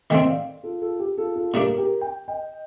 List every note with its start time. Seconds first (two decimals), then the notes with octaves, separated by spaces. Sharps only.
0.10 D#3 A3 C4 D#5 G5
0.28 D5 F5
0.63 F4 A4
0.82 F4 A4
0.99 G4
1.18 F4 A4
1.35 F4 A4
1.54 A#2 A3 D4 G4 A#4
1.77 G4 A#4
2.01 G5
2.28 D#5 G5